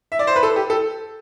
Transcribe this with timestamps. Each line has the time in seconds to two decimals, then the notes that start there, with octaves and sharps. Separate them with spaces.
0.12 E5
0.19 D5
0.27 C5
0.36 B4
0.43 A4
0.56 G4
0.70 A4